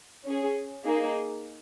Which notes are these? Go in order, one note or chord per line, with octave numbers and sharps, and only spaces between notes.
C#4 G#4
A#3 D#4 G#4